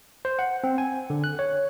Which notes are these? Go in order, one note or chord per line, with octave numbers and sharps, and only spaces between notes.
C5
F#5
C4
G#5
D3
F#6
C#5